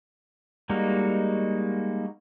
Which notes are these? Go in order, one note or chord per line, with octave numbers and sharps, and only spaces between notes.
G3 G#3 A#3 D#4 F#4